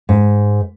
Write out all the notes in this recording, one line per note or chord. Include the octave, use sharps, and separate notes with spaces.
G#2